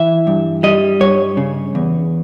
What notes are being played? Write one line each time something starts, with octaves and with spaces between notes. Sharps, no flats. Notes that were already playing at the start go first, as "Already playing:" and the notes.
Already playing: E3 E5
G2
G3 D#5
G2 C#5
C#3
E2